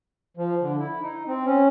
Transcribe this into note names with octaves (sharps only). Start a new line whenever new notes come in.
F3
D3
E4
D#4
C4
C#4